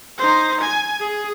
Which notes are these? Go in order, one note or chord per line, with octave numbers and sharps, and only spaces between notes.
D#4 C5
G#5
G#4